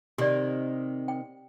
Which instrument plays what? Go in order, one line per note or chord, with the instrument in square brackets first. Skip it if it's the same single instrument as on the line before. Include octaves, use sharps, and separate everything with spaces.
[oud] C3 D#3 [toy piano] G4 D5
[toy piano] G5